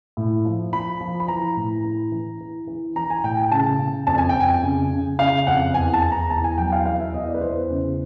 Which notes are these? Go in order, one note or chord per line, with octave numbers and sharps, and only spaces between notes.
A2
F3
F3 B5
F3
B5
E3 A#5
A2
E3
E3
E3
E3
E3 A#5
G#5
A2 G5
G#5
C#3 A5
C#3
F2 A5
G#5
G5
F2
G#5
C#3
C#3
C#3 F5
F2 F#5
E2 G#5
A5
E2
A#5
E2 A5
G#5
F#3 G5
F5
E2 F5
E5
E2 D#5
D5
B4
E2 C5
C#3